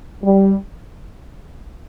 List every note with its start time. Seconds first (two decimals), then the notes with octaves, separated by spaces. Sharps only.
0.23 G3